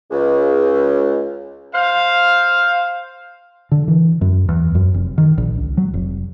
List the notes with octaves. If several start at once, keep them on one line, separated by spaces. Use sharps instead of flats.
C#2
C5 F5
D3
E3
F#2
E2
F#2
F1
D#3
A#1
C#2
F#3
F1